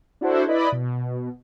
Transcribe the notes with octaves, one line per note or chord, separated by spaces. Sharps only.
D4 E4 F#4 A4 C5
E4 B4 D5 D#5 B5
B2